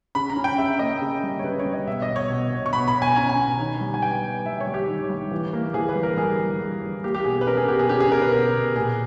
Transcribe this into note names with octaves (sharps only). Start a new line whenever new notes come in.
C#3 B5
A#5
C#4
G5
C#3 E5
A#3 D#5
C#3
G3
C#5
C#3 B4
C#5
G3
D#5
B2 E5
D#5
B2
C#5
B2
B2
C#6
B2 B5
B5
B2
G#5
C#4 A#5
G#5
B2
D#3
G3
G#5
B3 G5
B3
G3 E5
C#5
G3
G4
D#3
G3
E3
A#3
E3 G#4
B4
G3
A#4
G3 G#4
G3
G3
E3
A#3 G4
G4
B2 G#4
B4
C#4 A#4
G#4
B2 G4
G#4
C#4 G4
G#4
B2 A#4
B4
B2 A#4
B2
A#2 G#4